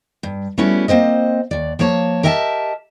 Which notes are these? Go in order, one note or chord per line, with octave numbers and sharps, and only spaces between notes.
G2
G3 A3 B3 C#4 E4 F#4
A#3 C4 C5 D#5
D#2 D5
F3 A#3 C#5 A5
G4 A#4 D#5 E5 F#5 A5